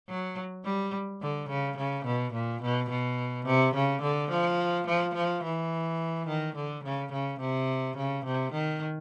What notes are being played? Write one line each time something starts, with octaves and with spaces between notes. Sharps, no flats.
F#3
G3
D3
C#3
C#3
B2
A#2
B2
B2
C3
C#3
D3
F3
F3
F3
E3
D#3
D3
C#3
C#3
C3
C#3
C3
D#3